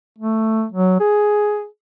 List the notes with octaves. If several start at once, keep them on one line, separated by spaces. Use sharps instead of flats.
A3
F#3
G#4